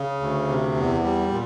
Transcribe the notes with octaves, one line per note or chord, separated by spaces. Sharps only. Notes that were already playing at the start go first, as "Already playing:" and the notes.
Already playing: C#3
D2
C3
E2
G3
A#2